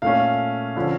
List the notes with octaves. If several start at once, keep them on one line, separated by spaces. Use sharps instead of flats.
A#2 A3 C#4 F5
D3 F3 C#4